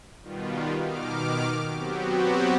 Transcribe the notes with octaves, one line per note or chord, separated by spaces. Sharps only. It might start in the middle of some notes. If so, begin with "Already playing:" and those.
B2 D#3 G3 B3 F4
B2 D#3 D6 F6
F#3 B3 C4 F#4 G4